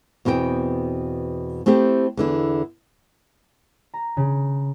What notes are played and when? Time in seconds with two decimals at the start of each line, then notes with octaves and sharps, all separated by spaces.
0.25 E2 B2 C4 A#4 G5
1.66 A3 C4 E4 G4 A4
2.17 E2 D3 E4
3.94 A#5
4.17 C#3